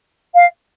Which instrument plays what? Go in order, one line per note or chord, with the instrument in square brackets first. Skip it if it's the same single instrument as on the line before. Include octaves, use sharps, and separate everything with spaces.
[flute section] F5